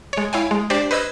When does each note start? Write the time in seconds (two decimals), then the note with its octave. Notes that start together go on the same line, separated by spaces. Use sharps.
0.13 G#3 C#5
0.33 E4 C#5 F5 G5 G#5
0.51 G#3
0.70 D4 G4 C5 D5
0.91 B4 C5 D#5 E6 G#6